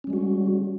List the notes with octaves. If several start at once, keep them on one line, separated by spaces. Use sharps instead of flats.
G3 G#3 C#4 F#4